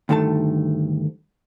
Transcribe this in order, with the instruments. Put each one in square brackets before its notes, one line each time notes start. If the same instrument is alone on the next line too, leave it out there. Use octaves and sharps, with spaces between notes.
[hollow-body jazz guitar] D2 G2 D#3 A3 A4 A5